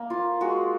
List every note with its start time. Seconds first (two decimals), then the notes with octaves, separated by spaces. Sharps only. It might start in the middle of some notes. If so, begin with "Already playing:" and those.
Already playing: A#3
0.10 F4
0.41 G#3 F#4